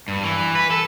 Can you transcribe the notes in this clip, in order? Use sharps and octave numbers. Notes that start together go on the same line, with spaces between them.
G2
E3
B4
A4